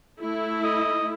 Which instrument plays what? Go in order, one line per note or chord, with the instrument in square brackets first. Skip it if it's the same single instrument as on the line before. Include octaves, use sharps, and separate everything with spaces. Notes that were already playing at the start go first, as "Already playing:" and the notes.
[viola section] A3 E4
[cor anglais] D#5